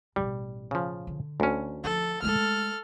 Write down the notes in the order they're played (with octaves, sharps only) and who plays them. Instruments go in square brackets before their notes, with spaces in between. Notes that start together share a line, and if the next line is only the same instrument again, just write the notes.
[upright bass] A1 B2 [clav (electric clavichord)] G3
[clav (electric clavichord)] C#3 F3
[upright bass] D3
[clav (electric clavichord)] D2 C#4
[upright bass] F3 [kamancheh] A4
[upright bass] G#3 A3 [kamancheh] A4 F6